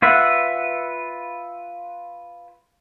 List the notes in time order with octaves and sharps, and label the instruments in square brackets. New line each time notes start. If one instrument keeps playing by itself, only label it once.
[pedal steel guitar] F4 B4 E5 F#5